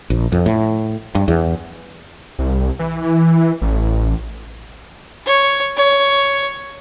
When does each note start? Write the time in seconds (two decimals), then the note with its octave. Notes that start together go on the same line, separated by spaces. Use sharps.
0.10 A#1
0.32 F2
0.46 A2
1.15 G2
1.28 E2
2.39 C2
2.79 E3
3.62 A1
5.26 C#5
5.77 C#5